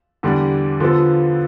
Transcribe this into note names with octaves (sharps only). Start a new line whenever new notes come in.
E2 D3 G3 D4
D3 F3 B3 F4 A4